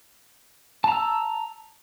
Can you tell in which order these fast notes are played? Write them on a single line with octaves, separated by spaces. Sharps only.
A5 A#5 E6